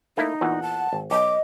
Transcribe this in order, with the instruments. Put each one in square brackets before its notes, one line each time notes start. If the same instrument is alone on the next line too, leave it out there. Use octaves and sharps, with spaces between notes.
[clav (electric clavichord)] A3 A#3 E4 [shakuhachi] D#4
[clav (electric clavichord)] E2 A#2 E3 [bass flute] F#5
[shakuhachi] A5
[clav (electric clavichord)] G#1
[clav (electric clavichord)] B1 [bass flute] D#5 [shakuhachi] D6